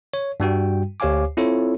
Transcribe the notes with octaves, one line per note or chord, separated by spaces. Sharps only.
C#5
G2 G3 F#4 G5
D2 G4 C#5 F5 G#5 D6
C4 E4 F4 A4 C#5